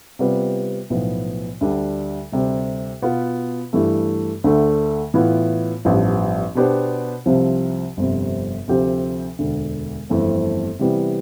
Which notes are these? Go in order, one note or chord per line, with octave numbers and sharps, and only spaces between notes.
C3 G3 B3 F4 B4
B1 A2 F3 B3
D2 D3 G3 D4
D2 C3 G3
B2 B3 F4 B4
G2 E3 A3
D2 D3 A3
A2 E3 B3 F4
A1 G2 F3 B3
B2 B3 D4 G4 C5
C2 C3 F3 C4
G1 F2 C3
D2 C3 F3 C4 G4
E1 D2 D3
G1 F2 E3 A3 C4
C3 E3 G3 B3